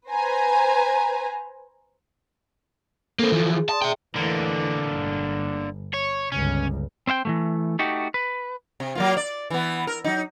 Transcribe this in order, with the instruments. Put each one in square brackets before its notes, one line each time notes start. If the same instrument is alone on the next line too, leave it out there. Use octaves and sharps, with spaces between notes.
[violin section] B4 C5 G#5 A#5
[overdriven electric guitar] A#3 C4 [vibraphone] A4
[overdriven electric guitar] E3 F3
[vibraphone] G#4
[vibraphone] D5 C6 D#6 [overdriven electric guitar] A5
[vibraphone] G#4 [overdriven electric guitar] E5 G5
[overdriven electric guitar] D3 A#3 [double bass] E3 A3
[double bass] G1
[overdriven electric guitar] C#5
[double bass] G1 C#2 [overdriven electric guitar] C#4
[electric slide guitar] C4 C5 E5 G5
E3 F3 A3
A3 D#4 F#4 G4
B4
[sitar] C3
F#3 A#3 F4
D5
E3 B3
A#4
F#3 D#4